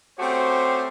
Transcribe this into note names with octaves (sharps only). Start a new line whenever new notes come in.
A3 C4 C#4 F#4 G4 C5